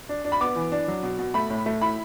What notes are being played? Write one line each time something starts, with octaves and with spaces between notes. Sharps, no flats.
D4
D4
B5
B3 D6
E3
D4
F#3
B2
B2
A3 B5
A2
A3
E4 B5